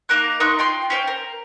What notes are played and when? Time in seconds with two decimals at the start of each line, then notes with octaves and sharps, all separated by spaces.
0.09 A#3 D#4 A#4 F#6
0.40 D#4 C6 C#6 F#6
0.59 F4 G5 C6
0.90 C#4 C5 G5
1.07 A#4